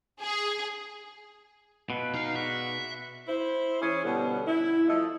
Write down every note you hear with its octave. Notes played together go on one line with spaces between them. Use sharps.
G#4
B2 E4 F4 B4
D#4 F5
G#3 D4 F#4 E5
E4 C5
E3 C#4 G#4
B2 D3 G3 B3 C#4
E4
F3 A3 A4 D#5